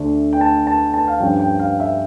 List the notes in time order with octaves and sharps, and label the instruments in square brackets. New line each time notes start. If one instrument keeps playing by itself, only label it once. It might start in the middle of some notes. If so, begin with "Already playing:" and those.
Already playing: [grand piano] D2 D3 A3 D4
G5
A5
A5
A5
F5
G2 F3 C#4 G5
G5
F5
E5